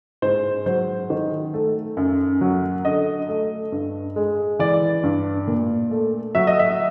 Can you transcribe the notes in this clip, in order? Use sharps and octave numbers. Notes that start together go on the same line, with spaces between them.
G#2 C5
F#3 C5
D#3
A3
F#2
F#3
D3 D#5
A3
G2
G#3
E3 D5
G2
A#2
A3
F#3 E5
D#5
E5